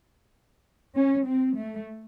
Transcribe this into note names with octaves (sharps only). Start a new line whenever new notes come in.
C#4
C4
A3